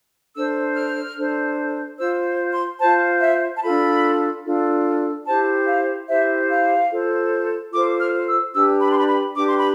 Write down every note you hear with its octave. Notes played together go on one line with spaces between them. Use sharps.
D4 A4 C5 E6
F6
D4 A4 C5
F4 C5 E6
C6
F4 C5 A5
E5
A5
D4 F4 A4 B5
D4 F4 A4
E4 G4 C5 A5
F5
E4 G4 C5 E5
F5
F4 A4 C5
F4 A4 C5 D6
F6
E6
D4 G4 B4 E6
B5
C6
B5
B5
D4 G4 B4 D6
C6
B5